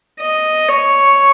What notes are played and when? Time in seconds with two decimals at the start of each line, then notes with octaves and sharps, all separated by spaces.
0.20 D#5
0.68 C#5